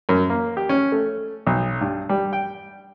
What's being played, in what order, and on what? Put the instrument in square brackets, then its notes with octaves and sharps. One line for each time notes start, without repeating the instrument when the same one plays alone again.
[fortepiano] F#2
A#3
G4
C#4
A3
B1
G2
G3
G5